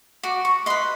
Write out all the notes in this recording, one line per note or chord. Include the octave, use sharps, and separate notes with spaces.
F#4 D6
C#6
B4 D#5 C6